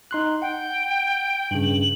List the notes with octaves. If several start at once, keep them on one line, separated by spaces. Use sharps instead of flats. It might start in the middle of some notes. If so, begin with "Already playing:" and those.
D#4 C6 F#6
F#5 G5
G2 C#3 F#7